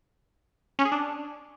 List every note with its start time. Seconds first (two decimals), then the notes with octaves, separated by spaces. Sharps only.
0.79 C#4
0.85 G#4
0.92 D4